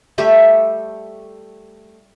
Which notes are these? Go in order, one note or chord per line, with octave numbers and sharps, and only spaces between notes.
G3 A3 G4 E5